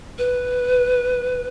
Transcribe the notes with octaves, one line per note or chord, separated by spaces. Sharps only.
B4